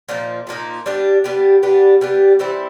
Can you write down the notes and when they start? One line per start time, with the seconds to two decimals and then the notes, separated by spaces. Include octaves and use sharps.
0.09 A#2 F3 A#3 D#4
0.47 A#2 F3 A#3 D#4
0.86 G3 B3 D4 G4
1.24 G3 B3 D4 G4
1.63 G3 B3 D4 G4
2.01 G3 B3 D4 G4
2.39 E3 G3 C4 E4